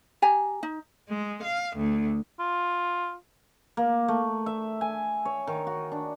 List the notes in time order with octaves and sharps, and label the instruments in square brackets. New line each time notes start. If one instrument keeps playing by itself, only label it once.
[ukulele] G4 G#5 A#5
D#4
[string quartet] G#3
F5
D2
[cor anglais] F4
[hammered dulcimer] A#3
A3
E5
G#5
C#5
D#3
F#4
D4